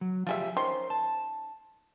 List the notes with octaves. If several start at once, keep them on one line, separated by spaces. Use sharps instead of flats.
F#3
F3 F4 G4 G#4 E5
D#3 C#4 C5 C6
A5